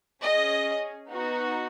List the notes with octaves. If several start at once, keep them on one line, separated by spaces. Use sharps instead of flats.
C#4 G#4 D#5
B3 D#4 F#4